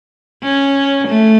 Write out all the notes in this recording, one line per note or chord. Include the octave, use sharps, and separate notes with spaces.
C#4
A3